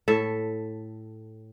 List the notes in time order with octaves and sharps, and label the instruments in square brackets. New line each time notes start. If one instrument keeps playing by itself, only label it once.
[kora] A2 A4 E5